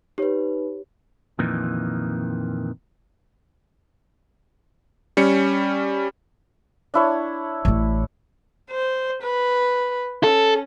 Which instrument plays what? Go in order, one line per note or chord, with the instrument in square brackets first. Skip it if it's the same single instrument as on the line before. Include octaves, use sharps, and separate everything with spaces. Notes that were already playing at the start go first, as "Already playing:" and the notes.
[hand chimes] D#4 B4 [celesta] G4 C#5
[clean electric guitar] F2 A#2 D#3 E3
[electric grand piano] G3 C#4 C#7
[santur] D4 E4 C#5
[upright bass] A1 A2
[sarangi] C5
B4
[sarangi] C#4 [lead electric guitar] A4